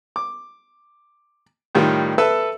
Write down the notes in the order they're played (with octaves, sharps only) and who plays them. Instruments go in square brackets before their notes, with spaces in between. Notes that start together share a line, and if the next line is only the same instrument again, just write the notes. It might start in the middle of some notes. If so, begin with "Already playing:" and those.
[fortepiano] D6
A2 D#3 G3 F4
A4 B4 E5 E6